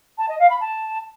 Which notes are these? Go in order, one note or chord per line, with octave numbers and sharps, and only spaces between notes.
A5
D#5
F5
B5
A5